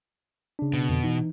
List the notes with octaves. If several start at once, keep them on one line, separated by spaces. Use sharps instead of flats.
C#3 D4
B2
F2 D3
E3 D#4